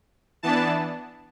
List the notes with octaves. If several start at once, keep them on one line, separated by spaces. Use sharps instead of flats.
E3 B3 D4 A5